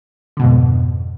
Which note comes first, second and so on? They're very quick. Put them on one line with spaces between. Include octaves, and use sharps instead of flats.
D3 B2 G#2 F2